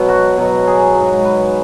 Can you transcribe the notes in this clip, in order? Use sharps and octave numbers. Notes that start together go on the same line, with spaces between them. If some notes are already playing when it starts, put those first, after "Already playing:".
Already playing: B2 F#3
F#4
B2 F#3
G#4
G#2 F#3
B4